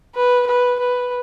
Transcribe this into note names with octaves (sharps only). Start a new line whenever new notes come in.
B4
B4
B4